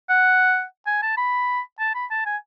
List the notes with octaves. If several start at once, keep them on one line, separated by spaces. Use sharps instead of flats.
F#5
G#5
A5
B5
A5
B5
A5
G#5